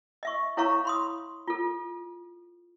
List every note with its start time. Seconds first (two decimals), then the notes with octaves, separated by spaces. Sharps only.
0.23 D#5 E5 C#6
0.57 E4 A4 C#5 F5 A#5 C#6
0.85 B5 C6 D#6
1.48 F4 A4